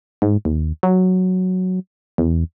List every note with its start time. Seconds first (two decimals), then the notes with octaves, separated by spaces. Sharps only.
0.22 G#2
0.45 D#2
0.83 F#3
2.18 E2